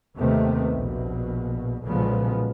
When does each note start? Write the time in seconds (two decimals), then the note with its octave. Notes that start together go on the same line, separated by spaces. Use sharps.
0.17 D#2 C3 D#3 A3 B3
0.73 A#1 B2
1.84 B1 A#2 C#3 F3 G#3 B3